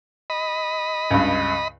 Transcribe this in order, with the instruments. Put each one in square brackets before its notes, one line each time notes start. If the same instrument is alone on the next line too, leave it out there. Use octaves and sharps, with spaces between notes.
[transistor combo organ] D#5 B5
[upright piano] C#2 G2